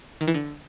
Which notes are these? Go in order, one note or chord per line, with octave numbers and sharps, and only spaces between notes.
D#3
E3
D3